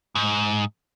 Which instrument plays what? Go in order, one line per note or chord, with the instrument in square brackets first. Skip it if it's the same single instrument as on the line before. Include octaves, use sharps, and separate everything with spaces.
[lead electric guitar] G#2